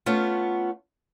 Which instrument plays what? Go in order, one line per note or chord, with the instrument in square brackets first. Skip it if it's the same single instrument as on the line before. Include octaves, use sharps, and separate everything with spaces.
[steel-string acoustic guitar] A3 B3 C#4 F4